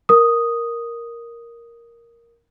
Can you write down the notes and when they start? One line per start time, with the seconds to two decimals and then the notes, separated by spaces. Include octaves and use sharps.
0.09 A#4 D#6